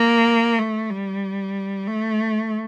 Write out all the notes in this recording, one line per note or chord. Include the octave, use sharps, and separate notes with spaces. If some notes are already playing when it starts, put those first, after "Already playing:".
Already playing: A#3
A3
G3
A3